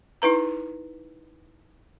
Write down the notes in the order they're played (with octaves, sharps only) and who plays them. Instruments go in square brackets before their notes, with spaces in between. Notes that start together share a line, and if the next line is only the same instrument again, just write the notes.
[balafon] D#4 E4 B4 A#5